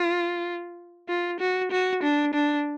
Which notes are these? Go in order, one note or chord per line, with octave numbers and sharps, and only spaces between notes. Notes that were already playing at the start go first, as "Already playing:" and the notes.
Already playing: F4
F4
F#4
F#4
D4
D4